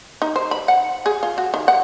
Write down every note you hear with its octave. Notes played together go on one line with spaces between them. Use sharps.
D#4
C5
B5
F#5
G#4
F4
F#4
D#3
F#5